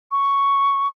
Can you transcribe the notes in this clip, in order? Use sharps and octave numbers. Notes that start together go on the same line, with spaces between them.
C#6